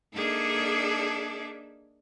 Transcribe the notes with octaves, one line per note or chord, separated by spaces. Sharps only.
A#3 D4 D#4 G#4 A4 E5